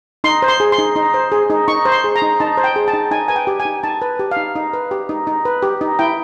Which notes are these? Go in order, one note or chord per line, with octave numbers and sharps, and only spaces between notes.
D#4 C6
C5
C6
G#4
C6
D#4
D#4
C5
G#4
D#4
D#4 C#6
C5
C6
G#4
A#5
D#4
D#4 A5
C5
G5
G#4
A5
D#4
D#4 G#5
B4 G#5
G5
G4
G#5
D#4
D#4 A5
B4
G4
F5
D#4
D#4
B4
G4
D#4
D#4
B4
G4
D#4
E4 G5